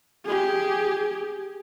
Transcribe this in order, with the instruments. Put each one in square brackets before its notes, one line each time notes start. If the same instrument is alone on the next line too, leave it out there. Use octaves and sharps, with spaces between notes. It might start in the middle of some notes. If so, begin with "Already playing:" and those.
[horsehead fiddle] G4 G#4